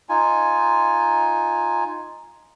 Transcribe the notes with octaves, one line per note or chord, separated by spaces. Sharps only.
D#4 F4 G#5